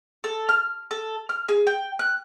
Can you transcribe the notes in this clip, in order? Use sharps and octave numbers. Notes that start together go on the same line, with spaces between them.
A4
F6
A4
F6
G#4
G5
F#6